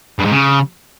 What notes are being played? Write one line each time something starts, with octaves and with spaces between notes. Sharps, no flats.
G2
G#2
C#3